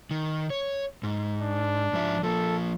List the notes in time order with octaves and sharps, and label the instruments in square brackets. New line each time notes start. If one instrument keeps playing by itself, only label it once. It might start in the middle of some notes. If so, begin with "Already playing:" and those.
[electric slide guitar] D#3
C#5
G#2
[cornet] D4
[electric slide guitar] G#2 F3 E5
[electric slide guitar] F3 A#3 [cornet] A4